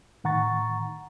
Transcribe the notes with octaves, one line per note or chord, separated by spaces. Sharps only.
A2 D#3 F#5 A#5 C#6 A6